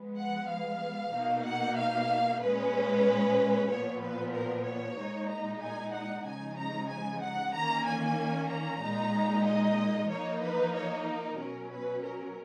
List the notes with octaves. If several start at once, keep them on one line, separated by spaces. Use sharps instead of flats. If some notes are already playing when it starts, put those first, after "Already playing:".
Already playing: F3 G#3 B3
F#5
F5
B2 A#3 D#4
F#5
F5
A#2 G#3 C#4 B4
A#2 F3 B3 C#5
B4
A#4
C#5
A#2 G#3 D#4
A#5
G#5
F#5
C#3 F3 G#3 D#4 G#5
A#5
G#5
F#5
D#3 A#3 C#4 A#5
G#5
A#5
A#2 G#3 D#4
D#5
F3 A#3 D#4 C#5
B4
C#5
A#4
B2 F#3 C#4
B4
A#4